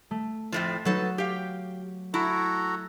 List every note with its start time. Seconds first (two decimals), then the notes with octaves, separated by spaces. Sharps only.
0.11 A3
0.52 F2 A2 F3
0.85 F#3 D#4 A4 B4
1.18 G4 F5 B6
2.14 E4 F#4 A4 A#5